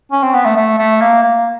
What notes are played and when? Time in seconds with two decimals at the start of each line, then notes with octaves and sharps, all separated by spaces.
0.12 C#4
0.23 C4
0.34 B3
0.45 A3
0.56 A3
0.78 A3
1.01 A#3
1.23 A#3